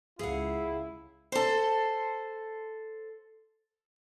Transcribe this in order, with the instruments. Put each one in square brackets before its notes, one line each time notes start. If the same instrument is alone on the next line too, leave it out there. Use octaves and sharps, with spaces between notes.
[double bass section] C#2 [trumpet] E4 [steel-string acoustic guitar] G#4 F5 F#5
[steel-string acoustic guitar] A4 C5